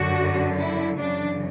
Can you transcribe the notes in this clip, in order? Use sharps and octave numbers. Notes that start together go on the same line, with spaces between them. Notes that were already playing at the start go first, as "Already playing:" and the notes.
Already playing: F#2 D3 F#4
E4
F#2 C#3 E3 D4